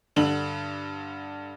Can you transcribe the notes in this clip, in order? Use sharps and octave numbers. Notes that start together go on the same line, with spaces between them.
G2 D3 F#7